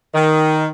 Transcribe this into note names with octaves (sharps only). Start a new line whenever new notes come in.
D#3